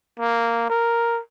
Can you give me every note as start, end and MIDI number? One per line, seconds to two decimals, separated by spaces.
0.19 0.66 58
0.70 1.20 70